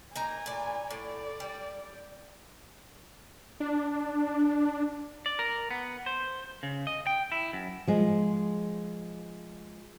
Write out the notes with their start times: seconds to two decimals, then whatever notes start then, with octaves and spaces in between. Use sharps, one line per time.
0.16 A#3 D#4 G#5 A#5
0.46 A2 D5
0.90 A2 D5
1.40 G3
3.60 D4
5.26 D5
5.39 A#4
5.71 B3
6.06 C5
6.63 C#3
6.87 D#5
7.07 G5
7.32 E4
7.53 F#2
7.87 F3 G#3